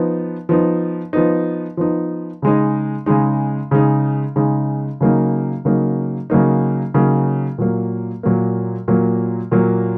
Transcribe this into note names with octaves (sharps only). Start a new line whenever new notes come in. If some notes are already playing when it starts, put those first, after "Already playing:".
Already playing: F3 B3 D#4
F3 B3 D#4
F3 B3 D#4
F3 B3 D#4
C#3 G#3 D#4
C#3 G#3 D#4
C#3 G#3 D#4
C#3 G#3 D#4
C#3 F#3 A#3 D#4
C#3 F#3 A#3 D#4
C#3 F#3 A#3 D#4
C#3 F#3 A#3 D#4
A#2 F#3 A#3
A#2 F#3 A#3
A#2 F#3 A#3
A#2 F#3 A#3